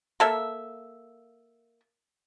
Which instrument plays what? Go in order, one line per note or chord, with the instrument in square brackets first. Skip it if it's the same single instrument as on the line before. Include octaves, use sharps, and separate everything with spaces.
[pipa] A#3 A4 E5